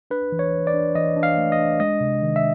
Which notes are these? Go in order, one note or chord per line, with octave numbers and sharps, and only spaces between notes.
D4 B4
E3
C#5
E3
D5
D4
E3 D#5
D4
F5
A3
D#5
D4
G#3 D#5
C3
D#3
E5